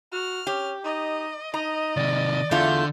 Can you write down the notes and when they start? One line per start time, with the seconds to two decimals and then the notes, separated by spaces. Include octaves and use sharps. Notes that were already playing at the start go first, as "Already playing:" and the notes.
0.12 F#4 F6
0.47 C#4 G4
0.84 D#4 D#5
1.54 D#4 D#5 A#5
1.97 C3 D#3 D5
2.51 E2 D3 A3 F4 G6